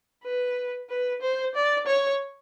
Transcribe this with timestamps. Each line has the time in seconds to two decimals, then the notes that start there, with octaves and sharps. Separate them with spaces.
0.24 B4
0.89 B4
1.21 C5
1.54 D5
1.87 C#5